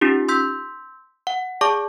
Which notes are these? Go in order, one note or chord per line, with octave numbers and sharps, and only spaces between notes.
C#4 D#4 F4 G4
C6 E6 G6 B6
F#5
G#4 D5 A5 C#6 D6